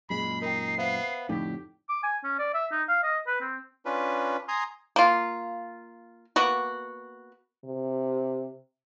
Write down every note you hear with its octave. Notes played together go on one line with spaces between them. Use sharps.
F#2 A#2 G#3 B5 C7
D#4 A#4 G5
B3 C5 E5 F5
F2 A2 D3 D#4 G4 B6
D6
G#5
C#4
D5
E5
D#4
F5
D#5
B4
C4
C#4 D4 F4 B4
G#5 A#5 C6 D#6
A#3 F4
A#3 B3 F#4
C3